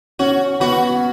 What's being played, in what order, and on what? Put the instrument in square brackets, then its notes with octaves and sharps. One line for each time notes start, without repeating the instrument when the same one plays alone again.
[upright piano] C#4 [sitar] F#4
[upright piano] B3 [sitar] F#4